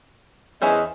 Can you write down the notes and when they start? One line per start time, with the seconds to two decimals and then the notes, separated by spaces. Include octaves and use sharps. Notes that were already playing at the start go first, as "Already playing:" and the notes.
0.62 E2 C#4 E4 C5 D#5